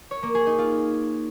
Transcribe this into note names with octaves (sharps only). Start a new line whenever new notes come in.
C#5
A#3
G#4
D#4
F4